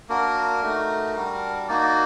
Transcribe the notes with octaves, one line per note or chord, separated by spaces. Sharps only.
A#3 D4 F#4 A#4
A3 D#4 F#4
G3 D4 F#4
A#3 D#4 F#4 D5
D5